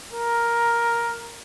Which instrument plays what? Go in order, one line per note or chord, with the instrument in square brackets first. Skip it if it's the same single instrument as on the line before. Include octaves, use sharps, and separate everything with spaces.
[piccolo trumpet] A#4